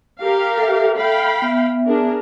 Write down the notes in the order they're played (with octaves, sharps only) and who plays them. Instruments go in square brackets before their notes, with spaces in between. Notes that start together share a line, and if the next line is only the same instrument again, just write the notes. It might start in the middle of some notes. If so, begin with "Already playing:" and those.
[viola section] G4 A#4 F5
[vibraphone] A4 E5
[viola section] F5 G5 B5
[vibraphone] B3 E5
[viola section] D4 G#4 A#4